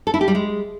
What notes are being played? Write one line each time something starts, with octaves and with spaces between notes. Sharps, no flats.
A4
E4
G4
G3
G#3